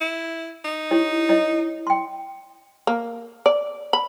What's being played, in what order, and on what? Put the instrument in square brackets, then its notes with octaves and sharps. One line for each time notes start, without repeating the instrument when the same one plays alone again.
[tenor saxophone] E4
D#4
[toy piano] E4 G4 C#5
E4 C#5 D#5
G5 C6
[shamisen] A#3
D5
B5